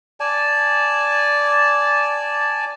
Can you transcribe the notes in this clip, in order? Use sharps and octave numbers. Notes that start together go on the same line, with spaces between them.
D5 G#5 A5